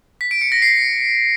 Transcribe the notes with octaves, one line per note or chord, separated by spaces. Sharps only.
B6
D7
C#7
A#6
C7